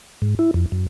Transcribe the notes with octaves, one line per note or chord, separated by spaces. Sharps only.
G#2
E4
F2
F#2